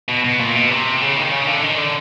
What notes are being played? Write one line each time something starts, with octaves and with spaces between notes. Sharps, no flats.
B2
B2
A#2
B2
C3
C#3
D#3
C#3
D3
D#3
D3